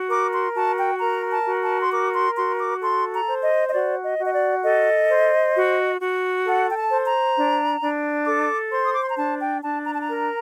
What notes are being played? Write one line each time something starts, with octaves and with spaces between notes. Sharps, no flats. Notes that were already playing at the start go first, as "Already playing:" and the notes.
Already playing: F#4
A#4 D6
C6
F#4 A5
G5
A#4 A#5
A5
F#4
A5
C6
A#4 D6
C6
F#4 C6
D6
A4 C6
A#5
C5
D#5
D#5
F#4 D5
D#5
F#4
D#5
D5
A4 D#5
C5
F#4
F#4
A4 F#5
G5
A5
C5
A#5
D4
D4
A4 D6
C5 C6
D#6
D6
C6
A#5
D4 A5
G5
D4 A5
A#5
A5
A#5
A#4